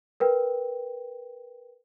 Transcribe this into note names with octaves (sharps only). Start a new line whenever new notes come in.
A#4 B4 G5